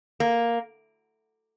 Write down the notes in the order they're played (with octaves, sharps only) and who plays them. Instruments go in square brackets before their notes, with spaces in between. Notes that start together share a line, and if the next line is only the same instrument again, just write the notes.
[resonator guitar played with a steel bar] A#3